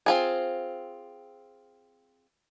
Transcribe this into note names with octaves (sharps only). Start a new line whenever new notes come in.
C4 F4 G#4